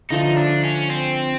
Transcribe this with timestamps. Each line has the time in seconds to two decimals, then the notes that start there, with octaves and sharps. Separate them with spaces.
0.10 D3 F3 A3 D#4
0.36 D4
0.64 C#4
0.90 C4